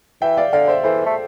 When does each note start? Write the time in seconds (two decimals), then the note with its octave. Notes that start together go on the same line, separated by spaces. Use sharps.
0.22 E3 E5 G5
0.37 D5 F5
0.53 D3 D5 F5
0.68 C5 E5
0.83 E3 A4 C5
1.06 A3